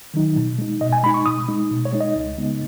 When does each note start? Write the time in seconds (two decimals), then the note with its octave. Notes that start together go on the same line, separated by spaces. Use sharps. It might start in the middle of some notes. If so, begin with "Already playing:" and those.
0.14 D#3 F#3 D#4
0.36 B2
0.58 G#3 D#4
0.81 B2 D#5
0.93 G#5
1.03 G#3 D#4 B5
1.14 C#6
1.26 B2 D#6
1.48 G#3 D#4
1.71 B2
1.85 C#5
1.93 G#3 D#4
2.00 D#5
2.15 C#2
2.38 C#3 G#3 B3 D#4